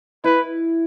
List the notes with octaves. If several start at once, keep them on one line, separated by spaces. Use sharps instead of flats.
E4 B4